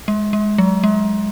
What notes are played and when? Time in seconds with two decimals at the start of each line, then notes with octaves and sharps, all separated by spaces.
0.08 G#3
0.33 G#3
0.58 F#3
0.84 G#3